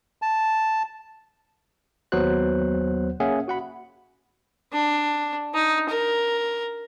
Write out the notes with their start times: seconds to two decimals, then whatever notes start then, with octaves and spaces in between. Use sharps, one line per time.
0.22 A5
2.12 D#2 F#3 B3 F#4 C5 F#6
3.20 A#3 C#4 G#4 E5 F#5
3.48 F#4 F#5 B5
4.73 D4
5.54 D#4
5.89 A#4